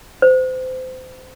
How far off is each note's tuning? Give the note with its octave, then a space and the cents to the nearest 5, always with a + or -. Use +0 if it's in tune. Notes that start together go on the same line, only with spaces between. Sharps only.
C5 -30